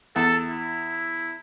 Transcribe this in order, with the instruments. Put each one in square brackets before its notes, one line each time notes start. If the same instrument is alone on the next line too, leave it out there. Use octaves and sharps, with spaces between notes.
[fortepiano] E2 [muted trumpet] A4
[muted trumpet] E4